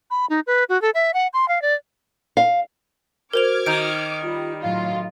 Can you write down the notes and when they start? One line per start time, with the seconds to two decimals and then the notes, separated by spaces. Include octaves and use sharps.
0.11 B5
0.30 D#4
0.47 B4
0.69 F#4
0.82 A4
0.94 E5
1.14 F#5
1.33 C6
1.48 F5
1.62 D5
2.37 F5
3.33 F#4 A#4 C5 D6 F6 G#6 F7
3.66 D#3 A#5 G6 D7
4.23 G3 F4
4.62 A2 F#3 F4 F5